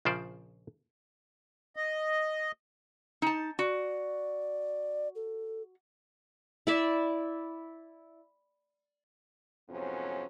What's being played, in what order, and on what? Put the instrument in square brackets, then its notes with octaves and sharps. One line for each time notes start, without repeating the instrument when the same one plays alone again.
[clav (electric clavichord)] A#1 C#3 F3 C5 D5
[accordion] D#5
[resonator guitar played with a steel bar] D#4 A5
[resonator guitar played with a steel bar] F#4 [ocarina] D5
[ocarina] A4
[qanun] E4 D5 E5
[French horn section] F2 G#2 C3 F#3 B3 C#4